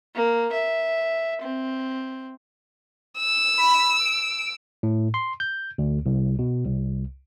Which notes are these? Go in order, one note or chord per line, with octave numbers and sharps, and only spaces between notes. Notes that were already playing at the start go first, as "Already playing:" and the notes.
A#3
E5
C4
E6
B5
D7
A2
C6
G6
D2
C2
B2
C2